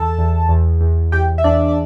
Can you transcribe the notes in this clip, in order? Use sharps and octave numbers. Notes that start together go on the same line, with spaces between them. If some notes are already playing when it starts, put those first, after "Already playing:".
Already playing: E2 A4 A5
E2
E2
E2
E2 G4 G5
E5
E2 D4 D5
D5